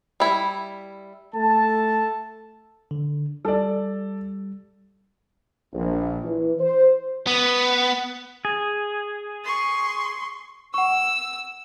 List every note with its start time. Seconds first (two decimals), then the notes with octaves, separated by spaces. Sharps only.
0.20 G3 E4
1.35 A3 A4 A5
2.91 D3
3.45 G3 A4 D5
5.74 A#1
6.25 E3
6.59 C5
7.27 B3
8.45 G#4
9.44 C6 C#6
10.74 F#5 C#6 E6